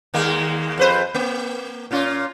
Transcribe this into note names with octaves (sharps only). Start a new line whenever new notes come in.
D#2 G#3 A#3
F2 B4 C5
A#3
A#2 C#4 F4